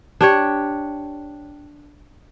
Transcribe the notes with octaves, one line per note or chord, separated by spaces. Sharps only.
D4 G4 C#5